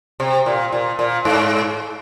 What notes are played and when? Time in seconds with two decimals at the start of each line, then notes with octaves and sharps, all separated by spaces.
0.20 C3
0.46 A#2
0.72 A#2
0.99 A#2
1.25 G#2